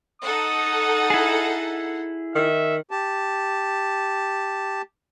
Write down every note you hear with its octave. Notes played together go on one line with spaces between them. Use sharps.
D#4 A4 F#5 D#6
E4 G#4
D#3 E5
G4 A5